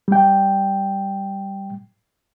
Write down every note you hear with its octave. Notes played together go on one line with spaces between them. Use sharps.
G3 G5